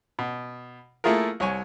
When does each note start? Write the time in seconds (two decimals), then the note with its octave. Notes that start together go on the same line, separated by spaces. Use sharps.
0.19 B2
1.04 A3 A#3 E4 F4 G#4 A#4
1.40 C2 C#5 G#5 C#6